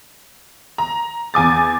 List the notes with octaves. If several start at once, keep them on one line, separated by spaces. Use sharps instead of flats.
A#5
E2 G#5 D6 A6